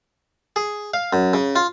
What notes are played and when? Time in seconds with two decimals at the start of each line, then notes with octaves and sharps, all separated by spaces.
0.56 G#4
0.94 F5
1.13 F#2
1.34 C#3
1.56 F4